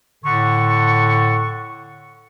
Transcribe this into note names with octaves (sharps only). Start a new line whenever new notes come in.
A2 D3 A4 F#5 C#6